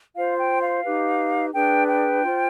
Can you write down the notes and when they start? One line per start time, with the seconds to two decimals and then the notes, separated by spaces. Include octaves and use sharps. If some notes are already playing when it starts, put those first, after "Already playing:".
0.15 F4 C5 F5
0.38 G5
0.61 F5
0.84 D#4 G4 B4
1.53 D4 G#4 B4 G5
1.87 G5
2.23 F4 C5